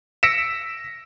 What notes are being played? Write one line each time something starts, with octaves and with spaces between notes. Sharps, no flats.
E6 A#6 B6 C#7 D7 E7